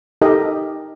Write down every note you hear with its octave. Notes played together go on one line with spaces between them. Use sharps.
D#4 G4 A4 A#4 D#5